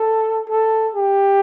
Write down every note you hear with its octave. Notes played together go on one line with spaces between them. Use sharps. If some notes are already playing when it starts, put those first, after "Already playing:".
Already playing: A4
A4
G4